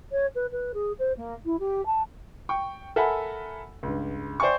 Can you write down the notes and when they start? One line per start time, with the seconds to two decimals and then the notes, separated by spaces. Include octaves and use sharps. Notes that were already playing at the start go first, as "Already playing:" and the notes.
0.12 C#5
0.35 B4
0.52 B4
0.74 G#4
0.99 C5
1.17 A#3
1.45 E4
1.59 G4
1.86 A5
2.49 G5 C#6
2.96 A4 A#4 E5 F#5 G#5 B5
3.83 C#2 G2
4.40 C5 D5 E5 G5 G#5 C#6